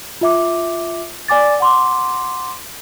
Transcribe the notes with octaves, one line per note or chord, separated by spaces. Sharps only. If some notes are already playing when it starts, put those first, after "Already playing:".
F4 E5 D6
D5 G#5 D6 A6
F#5 C6 D6